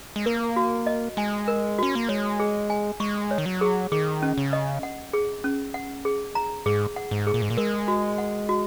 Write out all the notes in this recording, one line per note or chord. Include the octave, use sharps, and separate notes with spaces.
G#3
A#3 A#4
F#4
D#5
G#3 G#5
A#4
C#4 F#4
A#3
G#3 C#5
G#4
G#5
G#3 C#6
C#5
D#3
F#3
G#4
D#3 G#4
C#4
C#3
D#5
F#5
G#4
C#4
F#5
G#4
A#5
G#2 G#4
F#5
G#2
G#4
A#2
G#2
A#2
G#3 A#4
F#4
F#5
F#4